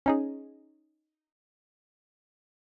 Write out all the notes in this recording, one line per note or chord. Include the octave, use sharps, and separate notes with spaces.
C#4 D#4 G#4